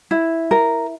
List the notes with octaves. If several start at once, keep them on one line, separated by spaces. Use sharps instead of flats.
E4
A#4